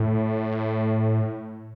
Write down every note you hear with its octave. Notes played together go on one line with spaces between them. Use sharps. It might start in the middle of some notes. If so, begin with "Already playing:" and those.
Already playing: A2